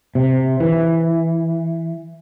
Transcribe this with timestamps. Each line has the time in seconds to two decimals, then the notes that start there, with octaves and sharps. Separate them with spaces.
0.15 C3
0.60 E3